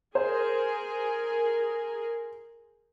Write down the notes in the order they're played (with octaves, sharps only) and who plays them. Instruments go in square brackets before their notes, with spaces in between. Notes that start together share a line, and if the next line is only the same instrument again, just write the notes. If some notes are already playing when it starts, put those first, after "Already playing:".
[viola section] G#4 A#4 [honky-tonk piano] C5